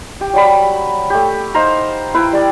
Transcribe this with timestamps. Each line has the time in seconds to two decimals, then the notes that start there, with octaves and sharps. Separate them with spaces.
0.21 G4
0.33 F#3 G3 B5
1.10 A3 G4
1.55 D#4 C5 F5 A#5
2.14 E4 B4 F5 G5
2.33 G3 D5